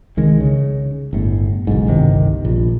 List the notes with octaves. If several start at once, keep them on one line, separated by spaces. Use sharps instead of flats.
C2 D#3 G#3
C#3
G1 A2
F#1 B1 G#2
G1 C2 C3 D#3
A#1